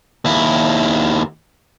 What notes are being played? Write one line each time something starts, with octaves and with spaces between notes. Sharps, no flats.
D#2 E4